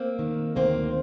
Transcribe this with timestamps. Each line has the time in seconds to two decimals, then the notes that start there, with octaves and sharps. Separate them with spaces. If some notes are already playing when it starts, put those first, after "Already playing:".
Already playing: A#3 C4
0.19 D#3
0.55 D2 A#3 C4